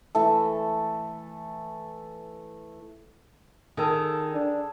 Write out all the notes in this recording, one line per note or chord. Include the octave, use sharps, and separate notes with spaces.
E3 A3 A4
D#3 G#4 A4 A5
D4